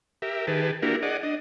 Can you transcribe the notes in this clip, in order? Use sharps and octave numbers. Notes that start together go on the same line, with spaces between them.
G4 A#4 E5
D#3 G4 G#4 B4 A5
A#3 D4 E4 F#4 G4 A#4
G#4 D5 D#5 F#5
D4 D#5